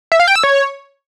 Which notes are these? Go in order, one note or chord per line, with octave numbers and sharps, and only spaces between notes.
E5
F5
G5
E6
C#5